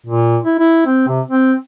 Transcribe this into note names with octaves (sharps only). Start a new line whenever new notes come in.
A#2
E4
E4
C4
C3
C4